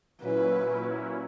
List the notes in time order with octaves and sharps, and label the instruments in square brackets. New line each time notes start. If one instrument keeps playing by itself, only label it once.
[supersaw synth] A#2 F#3 C#4 E4 [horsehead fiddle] B4